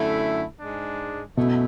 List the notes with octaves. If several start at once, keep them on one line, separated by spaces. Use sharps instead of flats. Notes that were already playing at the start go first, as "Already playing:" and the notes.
Already playing: F#2 D3 A3 E4
G#2 G#3 D4
F#2 B2 A3 E4